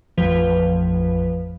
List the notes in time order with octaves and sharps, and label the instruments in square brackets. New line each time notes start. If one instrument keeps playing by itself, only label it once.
[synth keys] A1 F2 F3 B4